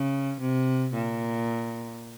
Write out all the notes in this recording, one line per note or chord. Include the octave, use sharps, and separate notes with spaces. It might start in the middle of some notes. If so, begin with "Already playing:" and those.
Already playing: C#3
C3
A#2